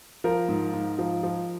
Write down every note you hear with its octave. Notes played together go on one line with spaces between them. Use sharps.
F3 A#4
G#2
G#2
F3
F3